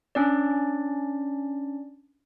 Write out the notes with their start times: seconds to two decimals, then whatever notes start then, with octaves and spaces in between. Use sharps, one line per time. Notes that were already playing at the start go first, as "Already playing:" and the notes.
0.15 C#4 D4 D5